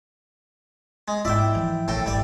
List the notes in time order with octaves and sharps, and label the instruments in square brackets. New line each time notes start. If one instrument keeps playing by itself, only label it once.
[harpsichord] G#3
[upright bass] G#2 B3 [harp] E4 G5 [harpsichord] D5 E5
[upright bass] E3 F3
[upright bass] A#1 [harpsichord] A2 A4 G5
[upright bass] G#1 [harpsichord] G3 D5